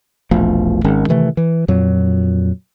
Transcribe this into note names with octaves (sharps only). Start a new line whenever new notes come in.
E1 A#1 F3 A3
G#1 D#3 G#3 C#4
C3 D#3 E3 A3
E3
F2 A#2 F#3